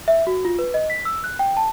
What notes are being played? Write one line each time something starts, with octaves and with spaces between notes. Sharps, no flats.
E5
F#4
F4
B4
D#5
B6
E6
F#6
G5
A5